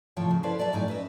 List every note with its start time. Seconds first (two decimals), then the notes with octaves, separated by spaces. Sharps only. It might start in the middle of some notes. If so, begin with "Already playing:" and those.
0.17 A2 C3 F3 C#5 G5
0.31 C#3
0.43 E4 A4 B4 C5 D5 F5
0.59 F#3 D5 E5 G5 A5
0.73 F#2 A2 F#3 D#4 D5 G#5
0.88 F#2 B4 D#5 E5